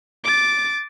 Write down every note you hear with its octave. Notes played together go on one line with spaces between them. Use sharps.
D6 A6